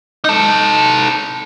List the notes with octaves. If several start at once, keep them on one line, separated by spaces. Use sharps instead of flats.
D#4 A4